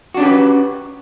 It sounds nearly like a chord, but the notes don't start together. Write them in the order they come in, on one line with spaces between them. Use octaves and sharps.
F#4 D4 C#4 G4 B4